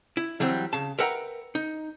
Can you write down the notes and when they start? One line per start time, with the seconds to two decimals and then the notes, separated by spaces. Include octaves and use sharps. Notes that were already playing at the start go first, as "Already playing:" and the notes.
0.17 E4
0.40 E3 F#3 G3 C4
0.73 C#3 A5
0.99 A#4 B4 E5 F#5 G5 A#5
1.55 D#4